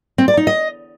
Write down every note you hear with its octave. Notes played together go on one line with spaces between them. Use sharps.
C4
D5
D#4
D#5